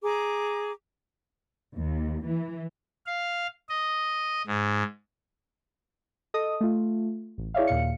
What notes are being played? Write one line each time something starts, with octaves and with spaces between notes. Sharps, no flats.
G#4 A#5 D6
D#2
E3
F5
D#5
G#2
A4 D#5 D#6
A3 F4
A1
E4 G#4 C#5 D5 E5 F5
D#2 A#2 F5 C#7